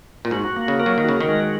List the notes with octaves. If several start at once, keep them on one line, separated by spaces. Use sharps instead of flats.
A#2
G#2 F#4
A#3
C#3
A#4
F#3
D#3
C#3 F#4
D#3
G#3